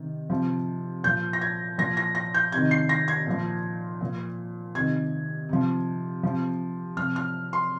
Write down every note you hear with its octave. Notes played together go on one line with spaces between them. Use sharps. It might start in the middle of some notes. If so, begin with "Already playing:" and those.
Already playing: C3 D#3
C3 F3
A#2 F3 G6
A#6
G#6
A#2 F3 A#6
A#6
A#6
G6
C3 D#3 G#6
C7
A#6
G#6
A#2 F3
A#2 F3
C3 D#3 G#6
C3 F3
C3 F3
C3 F3 F6
F6
C6